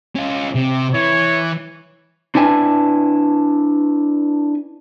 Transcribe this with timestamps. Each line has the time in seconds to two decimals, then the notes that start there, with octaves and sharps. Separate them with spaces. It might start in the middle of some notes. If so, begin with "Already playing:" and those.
0.16 C#4 F4
0.55 C3
0.94 E3 C#5
2.35 D4 E4 B4 G#5 A5